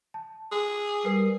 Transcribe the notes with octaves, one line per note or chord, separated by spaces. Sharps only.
A5
G#4
G3 A#4 B4 C7